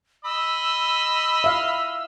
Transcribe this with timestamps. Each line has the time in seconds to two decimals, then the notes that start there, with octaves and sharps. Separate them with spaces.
0.25 D#5 B5 E6
1.44 E5 F5